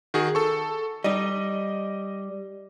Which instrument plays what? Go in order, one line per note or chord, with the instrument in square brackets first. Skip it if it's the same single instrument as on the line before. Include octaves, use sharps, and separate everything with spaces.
[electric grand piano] D#3 F#4 G#4
A4 C#6
[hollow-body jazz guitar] G3 D#4 [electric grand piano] D#5